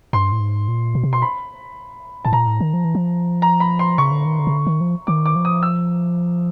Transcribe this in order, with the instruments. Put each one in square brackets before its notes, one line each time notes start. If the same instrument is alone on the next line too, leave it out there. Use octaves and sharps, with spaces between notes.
[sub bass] G2 [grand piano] C6
[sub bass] A2
G#2
A#2
B2
C3
[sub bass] B2 [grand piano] C6
[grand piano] B5
[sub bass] A2 [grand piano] A5
[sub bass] A#2 [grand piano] A#5
[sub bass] A2
D#3
F3
E3
F3
[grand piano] A#5
B5
C6
[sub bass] C#3 [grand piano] C#6
[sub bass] D3
D#3
D3
C#3
D3
D#3
F3
[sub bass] D#3 [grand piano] D6
[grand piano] D6
[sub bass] F3
[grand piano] D#6
E6